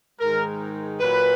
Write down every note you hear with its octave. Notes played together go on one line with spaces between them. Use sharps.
G#2 D#3 G#3 A#4
A#2 F#3 B4